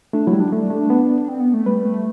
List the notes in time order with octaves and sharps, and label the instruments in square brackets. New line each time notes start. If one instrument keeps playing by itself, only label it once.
[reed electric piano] A3 [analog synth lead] D4
[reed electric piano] F#3 [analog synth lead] E4
[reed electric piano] G3
[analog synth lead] D4
[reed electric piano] A3
A3
B3
[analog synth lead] C4
B3
A3
[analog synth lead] G3 [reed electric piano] B4
[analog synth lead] A3